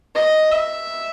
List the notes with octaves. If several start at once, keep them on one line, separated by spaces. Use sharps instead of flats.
D#5
E5